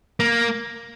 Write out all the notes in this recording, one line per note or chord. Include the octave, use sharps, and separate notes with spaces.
A#3